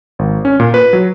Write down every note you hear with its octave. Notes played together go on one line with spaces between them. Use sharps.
G#1
C#4
A#2
B4
F#3